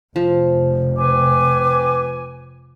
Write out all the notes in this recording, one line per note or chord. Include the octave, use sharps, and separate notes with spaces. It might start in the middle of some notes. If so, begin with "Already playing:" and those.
F1 F3
C4 B4 G#5 D6